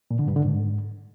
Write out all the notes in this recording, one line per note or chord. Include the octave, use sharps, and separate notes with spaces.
A#2
D3
G2
D3
G#2